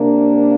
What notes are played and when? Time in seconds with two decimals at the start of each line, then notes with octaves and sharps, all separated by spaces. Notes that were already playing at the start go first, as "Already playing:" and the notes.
Already playing: C3 A#3 D4 A#4